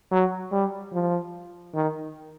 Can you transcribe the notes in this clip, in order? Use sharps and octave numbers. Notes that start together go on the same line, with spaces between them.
F#3
G3
F3
D#3